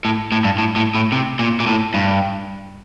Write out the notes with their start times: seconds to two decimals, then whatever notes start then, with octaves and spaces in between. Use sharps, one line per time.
0.05 A2
0.32 A2
0.44 G2
0.58 A2
0.76 A2
0.95 A2
1.12 C3
1.39 A#2
1.60 A#2
1.67 A2
1.94 G2